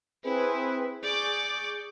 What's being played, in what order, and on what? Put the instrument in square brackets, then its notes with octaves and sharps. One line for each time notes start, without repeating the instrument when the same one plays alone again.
[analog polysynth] C4 G#4 B4 [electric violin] E4
[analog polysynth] G#4 C#6 G6 [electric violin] D5 D6